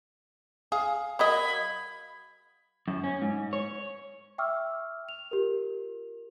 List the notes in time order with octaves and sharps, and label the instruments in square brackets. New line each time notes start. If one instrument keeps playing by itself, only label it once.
[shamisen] G#4 [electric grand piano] F5
[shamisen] F#3 A#4 D#5 [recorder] B5 [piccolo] G#6
[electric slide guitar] F#2
C#4
G#2
C#5
[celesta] E5 G5 C#6 D6 E6 F6
F7
F4 G4 A#4